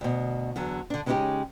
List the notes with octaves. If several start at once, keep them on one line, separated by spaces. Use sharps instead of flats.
D2 B2
E2 D3 F#3
D3 D4
C#3 G#3 B3 C#4 D#4 G4